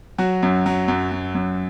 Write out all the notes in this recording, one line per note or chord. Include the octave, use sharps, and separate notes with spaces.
F#3 F#4
F#2
F#3
F#2
F#3
F#2